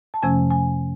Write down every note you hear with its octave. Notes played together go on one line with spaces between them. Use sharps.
A5
F2 C3 F3 A3 C#4 G#5
G#5